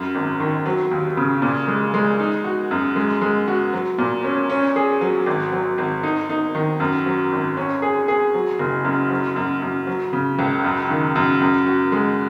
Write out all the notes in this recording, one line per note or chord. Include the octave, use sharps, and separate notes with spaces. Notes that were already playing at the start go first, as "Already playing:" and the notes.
Already playing: F#2
G#1
D#3
F#3
D#2
C#3
A#2
G#3
G#3
D#4
F#4
F#2
G#3
G#3
F#4
F#3
A#2
C#4
C#4
G#4
F#3
G#1
F#3
G#1
D#4
D#4
D#3
F#2
F#3
G#1
C#4
G#4
G#4
F#3
F#1
F#2
F#3
F#2
F#2
F#3
C#3
C#2
F#2
D#3
F#2
F#2
F#4
G#3